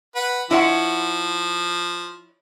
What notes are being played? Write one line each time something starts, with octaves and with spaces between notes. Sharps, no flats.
B4 F#5
F3 E4 C#5 F#5